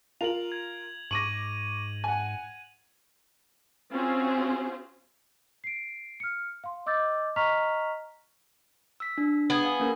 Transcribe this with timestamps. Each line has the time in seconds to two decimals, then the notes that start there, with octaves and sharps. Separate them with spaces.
0.21 F4 A#4 F7 F#7
0.52 G#6
1.11 G#2 C#6 D6 A#6 D#7 F#7
2.04 F#5 G#5
3.91 C4 C#4 F4 F#4 G#4 C5
5.64 C7 D7
6.20 F6 C#7
6.64 F5 C6
6.86 D#5 D6 E6 G6 A6
7.36 D#5 A#5 C#6 F6 B6 F7
9.00 E6 B6
9.18 D4
9.50 B3 G#4
9.65 F5
9.80 A#3 C#4 A#4